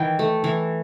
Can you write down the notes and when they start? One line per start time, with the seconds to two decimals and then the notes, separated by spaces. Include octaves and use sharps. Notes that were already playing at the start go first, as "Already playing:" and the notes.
Already playing: D#3 E3 G5
0.19 A3
0.44 E3